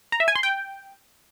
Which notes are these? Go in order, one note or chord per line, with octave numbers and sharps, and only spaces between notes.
A#5
E5
G#5
C6
G5